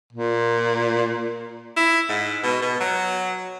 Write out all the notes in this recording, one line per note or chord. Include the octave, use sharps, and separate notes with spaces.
A#2
E4
G#2
B2
B2
F#3